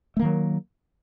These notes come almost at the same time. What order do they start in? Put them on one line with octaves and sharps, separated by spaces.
A3 A#3 D#3 F#3